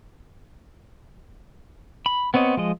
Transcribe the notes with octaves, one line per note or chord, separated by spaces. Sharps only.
B5
B3 C4 C#5 D#5
F3 G#3 D#5